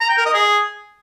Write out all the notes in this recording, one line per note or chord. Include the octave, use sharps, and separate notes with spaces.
A#5
G5
A#4
D#5
G#4